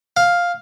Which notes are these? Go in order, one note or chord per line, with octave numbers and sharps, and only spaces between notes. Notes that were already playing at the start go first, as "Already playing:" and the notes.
F5